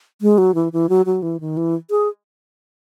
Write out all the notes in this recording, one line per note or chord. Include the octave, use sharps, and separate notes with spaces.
G#3
F#3
E3
E3
F#3
F#3
E3
D#3
E3
G#4